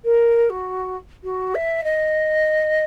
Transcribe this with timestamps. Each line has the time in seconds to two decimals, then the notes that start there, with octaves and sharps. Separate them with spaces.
0.04 A#4
0.49 F#4
1.23 F#4
1.54 E5
1.83 D#5